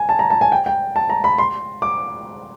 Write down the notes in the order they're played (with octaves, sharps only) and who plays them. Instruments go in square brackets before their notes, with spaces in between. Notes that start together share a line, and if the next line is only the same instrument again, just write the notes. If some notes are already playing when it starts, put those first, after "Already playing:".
Already playing: [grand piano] G#5
A5
A#5
A5
G#5
G5
G5
A5
A#5
B5
C6
D6